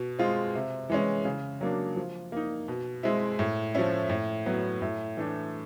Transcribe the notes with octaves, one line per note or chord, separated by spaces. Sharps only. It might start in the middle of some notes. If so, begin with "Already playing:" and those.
Already playing: B2
G#3 C4 F4
C3
E3 G#3 C#4
C#3
F#3 A#3 D4
F3
A#3 D#4
B2
G#3 C4 E4
A2
F3 A3 C#4 E4
A2
F#3 B3
A2
E3 A3 D4